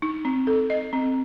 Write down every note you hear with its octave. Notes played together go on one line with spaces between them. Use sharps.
D#4
C4
A4
D#5
C4